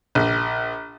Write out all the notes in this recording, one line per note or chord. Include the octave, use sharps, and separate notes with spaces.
A#1